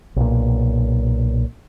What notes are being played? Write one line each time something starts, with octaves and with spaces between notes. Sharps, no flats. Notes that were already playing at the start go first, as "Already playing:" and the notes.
B1 A#2